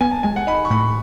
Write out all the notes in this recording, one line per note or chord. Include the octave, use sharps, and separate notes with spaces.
B3 G#5
A5
G#3 G#5
F#5
D#4 B5
C#6
A2 B5